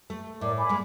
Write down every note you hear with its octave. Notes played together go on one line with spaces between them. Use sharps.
A3
A2 A#4 D5 D6
G#5 B5 D6
G#3 A#3